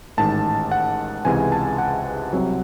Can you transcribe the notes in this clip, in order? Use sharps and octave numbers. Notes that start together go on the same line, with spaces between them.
A1 G#2 D#3 A5
F#5
C#2 C3 E3 G#3 G#5
A5
F#5
C2 C3 F#3